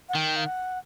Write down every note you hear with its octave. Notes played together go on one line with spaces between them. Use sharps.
F#5
D#3 G5
F5
F#5